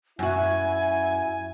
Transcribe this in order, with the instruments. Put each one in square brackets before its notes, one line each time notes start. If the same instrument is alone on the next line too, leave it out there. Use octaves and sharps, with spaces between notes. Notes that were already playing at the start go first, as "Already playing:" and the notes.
[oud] F#2 F#4 [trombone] E4 [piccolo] G#5